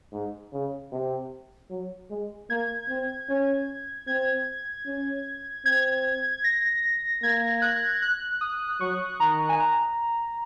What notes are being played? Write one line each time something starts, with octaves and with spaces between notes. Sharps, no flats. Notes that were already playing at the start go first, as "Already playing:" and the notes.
G#2
C#3
C3
F#3
G#3
A#3 G#6
C4
C#4
C4 G#6
C#4
C4 G#6
A#6
A#3 G#6
F#6
F#6
D#6
F#3 C#6
D#3 A#5
G#5
A#5